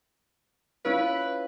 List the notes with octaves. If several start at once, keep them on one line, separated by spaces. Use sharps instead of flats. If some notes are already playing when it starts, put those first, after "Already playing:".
C#4 E4 F4 B4